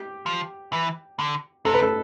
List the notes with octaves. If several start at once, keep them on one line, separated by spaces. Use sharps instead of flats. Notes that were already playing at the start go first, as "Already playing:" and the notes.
Already playing: G4
F3
E3
D3
C3 A4
B4
A4